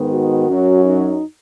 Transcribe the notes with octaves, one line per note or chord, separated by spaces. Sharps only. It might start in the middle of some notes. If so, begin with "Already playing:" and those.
Already playing: G#2 D#3 B3
F#4
F#2 F#3 C#4
D#4